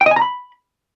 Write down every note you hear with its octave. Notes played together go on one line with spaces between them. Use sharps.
G5
D#5
G#5
A#5
B5